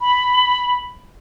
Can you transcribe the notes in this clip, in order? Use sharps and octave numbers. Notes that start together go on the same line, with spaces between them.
B5